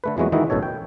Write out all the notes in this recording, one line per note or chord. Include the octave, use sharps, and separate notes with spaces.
D3 A3 B4
F2 E3 F#3 G#3 B3 F#4
D#3 E3 G#3 D#4 E4 F#4
A1 F#2 B2 A4 C#5
G5